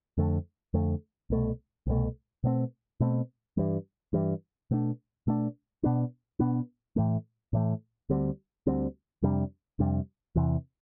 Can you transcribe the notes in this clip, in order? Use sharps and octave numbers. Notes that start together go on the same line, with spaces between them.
F2 D3 A3
F2 D3 A3
C2 B2 A3
C2 B2 A3
B2 A3 C4
B2 A3 C4
G2 E3 G3
G2 E3 G3
B2 A3 D4
B2 A3 D4
B2 B3 D4
B2 B3 D4
A2 E3 A3
A2 E3 A3
D2 D3 G3 C4
D2 D3 G3 C4
F2 C3 G3 D4
F2 C3 G3 D4
E2 C3 E3